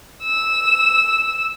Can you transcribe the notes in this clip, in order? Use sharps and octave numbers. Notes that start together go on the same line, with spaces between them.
E6